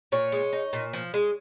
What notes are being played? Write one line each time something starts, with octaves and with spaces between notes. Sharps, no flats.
A#2 C#5
G#3
D#4
A#2
F3
G#3